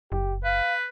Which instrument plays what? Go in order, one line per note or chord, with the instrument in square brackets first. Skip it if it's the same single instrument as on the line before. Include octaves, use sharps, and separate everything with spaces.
[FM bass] F#1 [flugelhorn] G4
[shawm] B4 [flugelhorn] F5